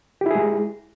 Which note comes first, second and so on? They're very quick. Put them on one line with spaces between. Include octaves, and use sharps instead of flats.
G4 E4 G#4 G#3